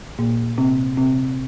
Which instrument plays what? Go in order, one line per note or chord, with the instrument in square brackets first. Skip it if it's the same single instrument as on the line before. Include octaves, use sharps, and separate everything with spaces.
[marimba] A#2 A#3
C3 C4
C3 C4